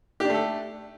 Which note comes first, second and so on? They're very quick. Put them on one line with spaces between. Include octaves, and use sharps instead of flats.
G4 D4 A3 A4